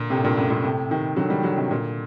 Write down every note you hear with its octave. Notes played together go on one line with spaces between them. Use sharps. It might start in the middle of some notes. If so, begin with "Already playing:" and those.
Already playing: A#2 D3
A2 C3
G2 A#2
F#2 A2
G2 A#2
A2 C3
C3 D#3
D3 F#3
D#3 G3
D3 F#3
C3 D#3
A#2 D3